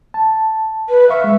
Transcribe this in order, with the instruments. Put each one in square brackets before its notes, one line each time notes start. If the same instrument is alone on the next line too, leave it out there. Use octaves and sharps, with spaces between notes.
[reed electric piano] A5
[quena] B4
[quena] E5 [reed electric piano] F5 C#6
[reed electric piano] G#3